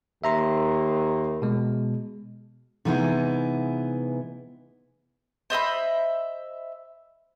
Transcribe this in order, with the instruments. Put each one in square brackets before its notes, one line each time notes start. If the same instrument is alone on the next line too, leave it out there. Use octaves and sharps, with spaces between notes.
[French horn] D#2 [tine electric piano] E5 A#5 C6
[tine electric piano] B2 G#3
[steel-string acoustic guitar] C3 E3 G#3 B3 D#4 E4
[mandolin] C5 D#5 E5 B5